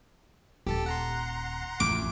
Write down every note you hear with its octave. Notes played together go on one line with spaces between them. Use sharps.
D#1 G4 A4 A5
F#5 A#5 C6
A1 F2 D6